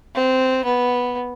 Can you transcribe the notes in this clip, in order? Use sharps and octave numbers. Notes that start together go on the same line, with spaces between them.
C4
B3